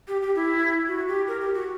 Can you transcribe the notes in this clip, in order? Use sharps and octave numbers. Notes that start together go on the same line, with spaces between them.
G4
G4
E4
F#4
G4
A#4
G4
F#4